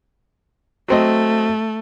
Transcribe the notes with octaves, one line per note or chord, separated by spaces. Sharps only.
F#3 A3 C4 D#5